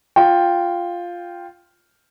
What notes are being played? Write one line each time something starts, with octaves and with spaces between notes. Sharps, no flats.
F4 G5